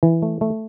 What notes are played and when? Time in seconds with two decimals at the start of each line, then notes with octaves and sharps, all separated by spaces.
0.03 E3
0.22 A3
0.41 A3